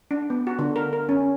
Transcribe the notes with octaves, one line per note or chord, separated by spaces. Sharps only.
D4
B3
F#4
D3
A#4
A#4
C#4